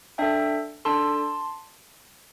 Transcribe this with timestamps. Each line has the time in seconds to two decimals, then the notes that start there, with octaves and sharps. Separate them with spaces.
0.18 D4 A4 E5 G5
0.85 D4 A4 A5 C6